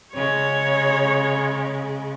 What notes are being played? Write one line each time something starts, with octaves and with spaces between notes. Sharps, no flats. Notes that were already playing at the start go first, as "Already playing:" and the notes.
C#3 G#3 C#5